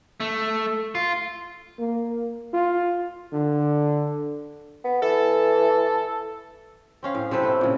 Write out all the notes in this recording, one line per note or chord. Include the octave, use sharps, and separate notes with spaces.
A3
F4
A#3
F4
D3
B3
E3 A4
C4 C#4 F5
A2
C3 C4 A4 B4
A2 E4
A#2 C#3